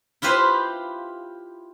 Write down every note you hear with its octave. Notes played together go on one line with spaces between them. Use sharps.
E4 F4 G4 B4 C5 F5